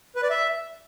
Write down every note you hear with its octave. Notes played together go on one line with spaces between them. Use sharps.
B4
D5
E5